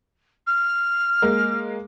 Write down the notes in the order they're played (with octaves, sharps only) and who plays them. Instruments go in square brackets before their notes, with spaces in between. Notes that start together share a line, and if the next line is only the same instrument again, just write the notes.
[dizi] F6
[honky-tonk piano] G#3 A#3